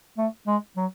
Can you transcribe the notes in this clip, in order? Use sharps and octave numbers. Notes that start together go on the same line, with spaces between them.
A3
G#3
F#3